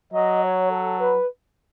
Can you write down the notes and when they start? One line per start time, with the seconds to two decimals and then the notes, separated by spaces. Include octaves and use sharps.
0.13 F#3 D#5
0.42 C#5
0.71 A4
1.00 B4